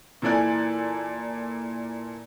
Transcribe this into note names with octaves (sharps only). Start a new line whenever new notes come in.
A#2 E3 A4 D5 G#5 F#6